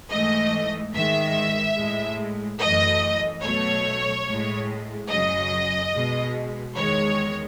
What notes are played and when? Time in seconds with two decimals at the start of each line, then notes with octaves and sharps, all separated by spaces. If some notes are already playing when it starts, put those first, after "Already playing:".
0.11 G#2 E3 A3 D#5
0.94 G#2 D#3 G#3 E5
1.77 A2 G#3
2.60 F#2 E3 A3 D#5
3.43 B2 F#3 A3 C#5
4.27 A2 G#3
5.09 F#2 C#3 F#3 D#5
5.93 B2 G#3
6.75 E2 D#3 G#3 C#5